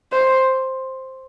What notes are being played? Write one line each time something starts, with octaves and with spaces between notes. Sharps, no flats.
C5